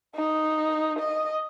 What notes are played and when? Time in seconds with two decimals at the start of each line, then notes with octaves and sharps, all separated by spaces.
0.15 D#4
0.99 D#5